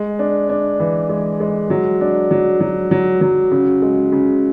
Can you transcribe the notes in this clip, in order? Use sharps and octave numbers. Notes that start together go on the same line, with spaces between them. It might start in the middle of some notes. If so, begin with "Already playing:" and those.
Already playing: G#3
D4
D4
E3
G#3
G#3
F#3
D4
F#3
F#3
F#3
F#3
C#3
G#3
C#3